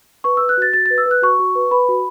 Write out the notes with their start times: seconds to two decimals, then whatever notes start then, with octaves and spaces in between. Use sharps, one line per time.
0.24 B4 C#6
0.37 B4 E6
0.49 F#6
0.58 F#4 A6
0.73 F#4 A6
0.86 B4 A6
0.98 E6
1.06 B4
1.11 F#6
1.22 F#4 C#6
1.39 F#4
1.55 B4
1.71 B4 B5
1.89 F#4